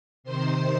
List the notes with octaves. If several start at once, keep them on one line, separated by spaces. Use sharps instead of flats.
C3 D#3 C5 C6